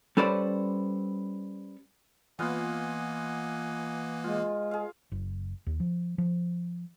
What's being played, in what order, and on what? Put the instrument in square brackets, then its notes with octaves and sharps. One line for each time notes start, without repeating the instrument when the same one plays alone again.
[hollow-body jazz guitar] G3 C#4 A4 B4 C5 D5
[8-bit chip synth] E3 A#3 [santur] B3 F4 F5 [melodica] D#5 F#5 G#5
[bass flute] G#3 [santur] F4
[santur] G#4 F5
[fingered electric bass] F#1
D#2
F3
F3